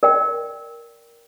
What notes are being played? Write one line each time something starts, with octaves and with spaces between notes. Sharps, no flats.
A#4 D5 G5